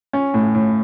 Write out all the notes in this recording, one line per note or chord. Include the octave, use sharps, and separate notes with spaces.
C#4
A2
A2